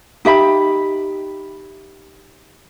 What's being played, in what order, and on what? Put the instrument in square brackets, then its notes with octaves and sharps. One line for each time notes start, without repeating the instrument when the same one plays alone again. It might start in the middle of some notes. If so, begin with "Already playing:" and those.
[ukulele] D#4 G4 E5 B5